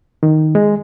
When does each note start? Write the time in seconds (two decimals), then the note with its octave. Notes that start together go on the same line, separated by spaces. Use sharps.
0.23 D#3
0.55 G#3